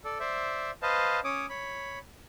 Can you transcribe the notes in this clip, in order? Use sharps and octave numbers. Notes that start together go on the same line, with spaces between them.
A4 D5
C5 D5 E5
B4 C5 D#5 F5 A5
C#4 C#5 D6 D#6
C#5 B5